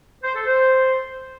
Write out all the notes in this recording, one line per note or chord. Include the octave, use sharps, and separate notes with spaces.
C5
A4
C5